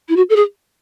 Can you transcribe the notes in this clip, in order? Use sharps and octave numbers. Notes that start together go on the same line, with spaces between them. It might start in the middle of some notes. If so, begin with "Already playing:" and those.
E4
F#4
A4
G#4